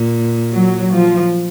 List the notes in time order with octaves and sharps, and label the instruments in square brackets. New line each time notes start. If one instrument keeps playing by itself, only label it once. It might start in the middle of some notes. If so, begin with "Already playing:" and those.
Already playing: [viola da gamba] A#2
[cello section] F#3
F3